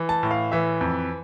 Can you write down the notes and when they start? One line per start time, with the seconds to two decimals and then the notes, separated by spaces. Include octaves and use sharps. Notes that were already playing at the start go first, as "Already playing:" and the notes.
Already playing: E3
0.09 A5
0.23 A2
0.31 F5
0.52 E3 E5
0.81 F2